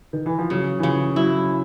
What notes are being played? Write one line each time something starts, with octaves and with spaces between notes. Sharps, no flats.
D#3
E3
F3
C#3 F#3
E3
C#3 F3
F#3 E4